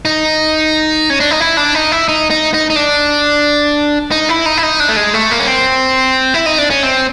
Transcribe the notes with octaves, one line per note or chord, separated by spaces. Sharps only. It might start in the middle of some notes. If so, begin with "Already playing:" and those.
D#4
C#4
D4
D#4
E4
D4
D#4
E4
D#4
D#4
D#4
D#4
D4
D#4
E4
D#4
E4
D#4
D4
A3
G#3
A3
A#3
C#4
C4
E4
D#4
D4
C#4
C4